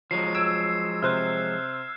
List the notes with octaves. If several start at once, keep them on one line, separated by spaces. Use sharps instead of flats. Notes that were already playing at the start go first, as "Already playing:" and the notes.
F3 F#3 G#3 C7
E6 G#6 D7
C3 C5 F6 F#6